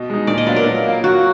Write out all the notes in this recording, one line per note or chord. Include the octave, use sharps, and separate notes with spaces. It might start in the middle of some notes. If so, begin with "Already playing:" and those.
Already playing: B2 D#5
G#3 D#4
A#2 D5
D#5
F#3 B3 D4 F4 D5
A#4
F#3
A#3 F4
F#3 F#4